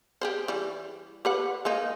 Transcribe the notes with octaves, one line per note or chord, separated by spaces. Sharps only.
G4 G#4 C5
E3 G3
G4 B4 F#5
G#3 A#3 D#4